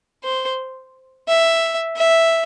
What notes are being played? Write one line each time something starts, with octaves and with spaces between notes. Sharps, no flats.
C5
E5
E5